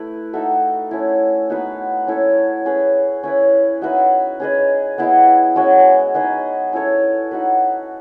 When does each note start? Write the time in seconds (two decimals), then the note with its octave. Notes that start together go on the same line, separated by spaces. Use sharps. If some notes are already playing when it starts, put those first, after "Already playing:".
Already playing: A3 E4 B4
0.33 D#4 F#4 A4 E5
0.91 A3 C#4 E4
1.50 B3 D#4 F#4 B4
2.07 C#4 E4 A4 C#5
2.66 C#4 G#4 B4
3.23 C#4 E4 B4
3.81 D#4 F#4 B4 E5
4.40 C#4 G#4 B4 D#5
4.98 B3 E4 G#4 D#5
5.56 G#3 C#4 F#4
6.15 D#4 G#4 B4 D#5
6.73 C#4 E4 A4 C#5
7.31 D#4 F#4 B4